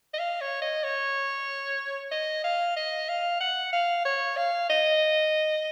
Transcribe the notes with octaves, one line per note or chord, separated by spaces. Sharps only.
D#5
F5
C#5
D#5
C#5
D#5
F5
D#5
F5
F#5
F5
C#5
F5
D#5